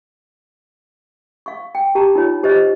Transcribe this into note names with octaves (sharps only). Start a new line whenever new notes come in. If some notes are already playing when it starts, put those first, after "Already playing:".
F5 C#6
G5
G4 A5 A#5
D#4 F4 C#5
G4 C5 C#5 D#5